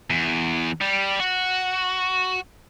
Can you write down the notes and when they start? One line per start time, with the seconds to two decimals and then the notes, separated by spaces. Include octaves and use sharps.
0.10 E2
0.81 G3
1.20 F#4